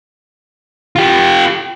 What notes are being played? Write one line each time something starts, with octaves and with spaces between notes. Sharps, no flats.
F4 G4